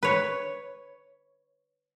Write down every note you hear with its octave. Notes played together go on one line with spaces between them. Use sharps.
B4 C#5